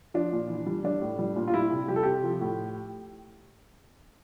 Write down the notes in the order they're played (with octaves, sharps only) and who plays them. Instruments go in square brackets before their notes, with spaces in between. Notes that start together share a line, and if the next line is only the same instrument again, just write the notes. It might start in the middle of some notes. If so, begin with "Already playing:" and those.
[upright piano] F3 D4
A#2
E3
G3
G3 D4
A2
G3
A#2
F4
G3 E4
C3
G3 G4
A4
C3 G4
F3
A2